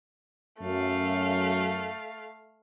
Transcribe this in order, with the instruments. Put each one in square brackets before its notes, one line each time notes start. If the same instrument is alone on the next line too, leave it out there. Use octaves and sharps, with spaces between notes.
[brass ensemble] F#2 [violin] A3 F5